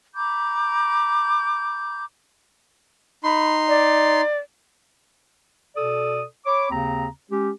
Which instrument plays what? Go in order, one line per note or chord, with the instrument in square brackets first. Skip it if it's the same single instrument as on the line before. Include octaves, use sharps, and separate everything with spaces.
[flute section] A#5 B5 D6 G6
[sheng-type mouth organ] D#4 C6 [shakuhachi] B5
[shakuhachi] D5
[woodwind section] B2 A4 D5 D#6
C#5 B5 D6
D#2 C#3 C4 A#5
G#3 C#4 G4